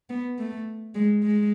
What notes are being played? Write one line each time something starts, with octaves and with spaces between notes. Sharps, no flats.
B3
A3
G#3
G#3